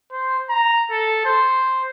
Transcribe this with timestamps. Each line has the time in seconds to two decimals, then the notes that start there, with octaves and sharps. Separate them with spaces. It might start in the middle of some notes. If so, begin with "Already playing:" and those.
0.12 C5
0.49 A#5
0.91 A4
1.25 C5